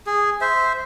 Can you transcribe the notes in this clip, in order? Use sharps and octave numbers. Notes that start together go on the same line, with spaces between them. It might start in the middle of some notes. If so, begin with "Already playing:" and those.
G#4
C5 E5